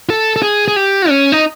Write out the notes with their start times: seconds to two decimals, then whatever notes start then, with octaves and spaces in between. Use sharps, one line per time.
0.10 A4
0.36 A4
0.43 G#4
0.68 G#4
0.76 G4
1.09 C#4
1.32 D#4